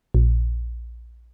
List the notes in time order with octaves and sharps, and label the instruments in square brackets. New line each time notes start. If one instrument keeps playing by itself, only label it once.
[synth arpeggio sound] A#1